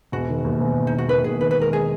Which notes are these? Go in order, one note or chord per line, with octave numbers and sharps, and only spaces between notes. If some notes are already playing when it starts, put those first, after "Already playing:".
E1 F#4
D#3
D#2
E1
D#2
D#4
E1
F#4
D#3 B4
E1 G#4
D#3 B4
B4
G#3 A#4
G#3 G#4